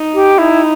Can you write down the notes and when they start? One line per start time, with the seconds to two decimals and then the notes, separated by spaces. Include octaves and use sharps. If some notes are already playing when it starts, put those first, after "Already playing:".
Already playing: D#4
0.14 G4
0.38 D#4 E4